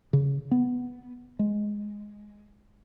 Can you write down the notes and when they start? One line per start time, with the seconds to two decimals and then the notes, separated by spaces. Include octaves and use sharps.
0.13 C#3
0.51 B3
1.39 G#3